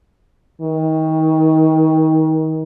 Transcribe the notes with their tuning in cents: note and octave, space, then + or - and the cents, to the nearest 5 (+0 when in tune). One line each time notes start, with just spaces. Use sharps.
D#3 +30